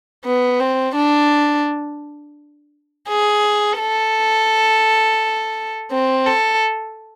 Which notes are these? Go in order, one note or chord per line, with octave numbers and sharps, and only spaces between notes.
B3
C4
D4
G#4
A4
C4
A4